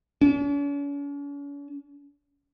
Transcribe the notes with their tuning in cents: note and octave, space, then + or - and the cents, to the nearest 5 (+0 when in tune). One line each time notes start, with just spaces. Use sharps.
C#4 +45